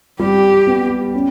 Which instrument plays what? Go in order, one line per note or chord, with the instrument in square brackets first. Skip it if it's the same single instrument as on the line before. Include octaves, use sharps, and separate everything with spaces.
[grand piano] G3 [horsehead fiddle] G4
[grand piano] B3
C#4